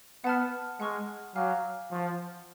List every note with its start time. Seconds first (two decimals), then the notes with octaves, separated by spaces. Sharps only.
0.24 B3 F#5 A5 F6
0.80 G#3 F#5 C#6 F6
1.36 F#3 F5 G#5 D6 F6
1.91 F3 F#5 C#6 F#6